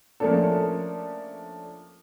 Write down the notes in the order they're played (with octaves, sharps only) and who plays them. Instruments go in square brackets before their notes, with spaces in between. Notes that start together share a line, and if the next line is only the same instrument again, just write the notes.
[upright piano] F3 A3 A#3 C#4 D4 A4